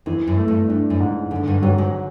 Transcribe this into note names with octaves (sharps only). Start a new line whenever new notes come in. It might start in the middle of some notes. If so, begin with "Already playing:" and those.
F2 E3
F#2
A3
G2
G2 D4
F#2
G#2
F#2 D3
G2
G2 F#3
G#2